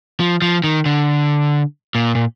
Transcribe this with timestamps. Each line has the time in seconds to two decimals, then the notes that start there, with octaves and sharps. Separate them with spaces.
0.20 F3
0.42 F3
0.64 D#3
0.86 D3
1.95 A#2
2.15 A#2